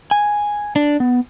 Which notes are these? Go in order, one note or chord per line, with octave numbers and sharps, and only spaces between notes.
G#5
D4
B3